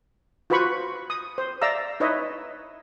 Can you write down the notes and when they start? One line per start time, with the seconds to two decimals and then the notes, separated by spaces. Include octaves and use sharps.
0.50 F4 F#4 B4 C5 B5 C#6
1.10 D#6
1.38 C5
1.61 D5 E5 F5 A#5 E6
2.00 D#4 E4 B4 C#5 D#5 E5